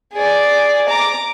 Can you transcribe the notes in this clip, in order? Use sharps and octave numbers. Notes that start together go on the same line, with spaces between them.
G#4 D5
A#5 D6